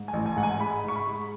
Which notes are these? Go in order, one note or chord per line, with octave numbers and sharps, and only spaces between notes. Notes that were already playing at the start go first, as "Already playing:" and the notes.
Already playing: G#2
G#5
A1
G#5
G#2 F#5
G#5
G#3 B5
G#2 C#6
B5
G#3